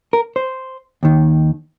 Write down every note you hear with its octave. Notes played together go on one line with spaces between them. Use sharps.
A#4
C5
D#2 D#3